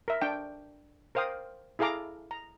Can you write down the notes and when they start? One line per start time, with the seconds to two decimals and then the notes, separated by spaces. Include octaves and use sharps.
0.08 A#4 E5
0.21 D4 G5
1.15 A#4 C5 F5 G5 D#6
1.79 E4 G#4 A4 F5 A#5 D6
2.31 A#5